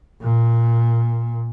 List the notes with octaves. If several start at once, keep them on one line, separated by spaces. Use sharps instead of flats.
A#2